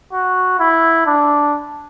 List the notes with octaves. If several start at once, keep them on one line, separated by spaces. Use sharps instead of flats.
F#4
E4
D4